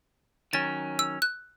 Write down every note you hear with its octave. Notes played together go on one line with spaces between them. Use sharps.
D#3 F#3 C#4 A6
E6
F#6